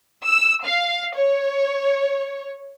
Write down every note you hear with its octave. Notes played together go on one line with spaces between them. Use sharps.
E6
F5
C#5